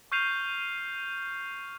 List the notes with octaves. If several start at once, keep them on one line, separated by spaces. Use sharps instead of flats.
C#6 F6 G6 C7 D#7 F7